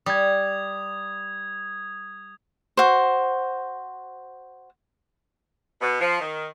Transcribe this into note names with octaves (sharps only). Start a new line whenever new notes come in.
G3 D#6 G#6
F#4 C5
B2
F3
D#3